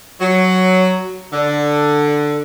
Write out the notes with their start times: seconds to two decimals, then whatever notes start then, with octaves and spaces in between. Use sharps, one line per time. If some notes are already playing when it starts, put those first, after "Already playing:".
0.20 F#3
1.32 D3